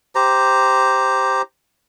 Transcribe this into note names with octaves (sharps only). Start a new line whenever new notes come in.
G4 C5 A#5